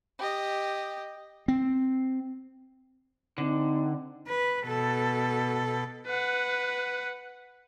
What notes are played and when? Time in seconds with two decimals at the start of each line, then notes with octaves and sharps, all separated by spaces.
0.18 G4 D#5
1.48 C4
3.38 D3 C4 D#4
4.27 B4
4.65 B2 A4
6.06 B4 F#5